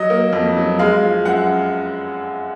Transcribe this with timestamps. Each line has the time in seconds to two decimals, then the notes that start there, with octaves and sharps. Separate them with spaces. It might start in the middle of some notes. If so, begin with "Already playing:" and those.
Already playing: F#3 D#5
0.10 A#3
0.33 F2
0.57 F#3
0.79 G#3 F5
1.03 F3
1.25 F#2 F#5